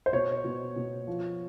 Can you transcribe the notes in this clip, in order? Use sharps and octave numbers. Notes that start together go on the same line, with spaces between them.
C5
B2 C#5
B2
B2
F3